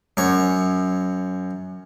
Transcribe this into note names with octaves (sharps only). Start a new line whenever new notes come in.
F#2 C#5